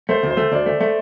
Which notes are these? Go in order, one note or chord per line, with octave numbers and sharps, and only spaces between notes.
A3 C5
D2
C5
A3
D2 D5
A3
A3